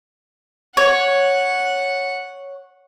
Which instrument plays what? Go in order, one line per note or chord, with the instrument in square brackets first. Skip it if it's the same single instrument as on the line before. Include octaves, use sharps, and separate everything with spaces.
[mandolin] C#5 [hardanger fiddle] F#5